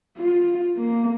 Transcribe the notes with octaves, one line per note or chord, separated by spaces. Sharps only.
F4
A#3